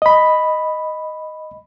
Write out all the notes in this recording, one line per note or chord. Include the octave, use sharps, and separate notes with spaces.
D#5 B5